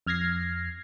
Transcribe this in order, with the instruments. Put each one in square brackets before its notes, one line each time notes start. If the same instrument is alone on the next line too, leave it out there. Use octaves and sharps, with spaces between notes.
[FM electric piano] F2 F6 G#6 A#6 C7